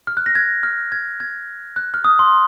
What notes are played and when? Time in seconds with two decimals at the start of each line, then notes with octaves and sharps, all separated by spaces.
0.07 F6
0.17 F#6
0.26 A#6
0.35 G#6
0.63 F6
0.92 G#6
1.20 G#6
1.76 F#6
1.94 F6
2.04 D#6
2.19 C6